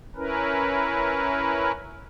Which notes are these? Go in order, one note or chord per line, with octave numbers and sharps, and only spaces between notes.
C#4 E4 A#4 B4